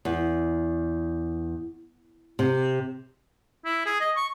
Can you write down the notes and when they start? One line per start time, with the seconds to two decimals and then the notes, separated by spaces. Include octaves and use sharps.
0.05 E2
2.39 C3
3.65 E4
3.86 G#4
4.00 D#5
4.16 C#6